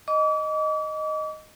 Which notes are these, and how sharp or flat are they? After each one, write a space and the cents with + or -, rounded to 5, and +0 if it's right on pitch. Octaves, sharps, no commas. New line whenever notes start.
D#5 +0 D6 -40